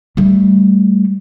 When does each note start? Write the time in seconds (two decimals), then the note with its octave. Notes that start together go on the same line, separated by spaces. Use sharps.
0.17 G3 A3